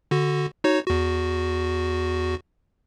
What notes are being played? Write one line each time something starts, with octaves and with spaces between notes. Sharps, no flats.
D3 F#4
D#4 F#4 C#5
E2 F#4